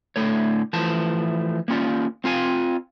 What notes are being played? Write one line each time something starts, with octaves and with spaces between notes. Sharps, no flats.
A2 D3 A3 C#5
E3 F3 A3 A5
A#3 C#4 F4 D5
C4 F4 F5 G#5